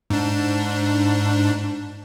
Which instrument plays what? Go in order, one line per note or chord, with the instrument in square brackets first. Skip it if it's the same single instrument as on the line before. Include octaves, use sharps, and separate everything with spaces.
[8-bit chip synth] G#2 D4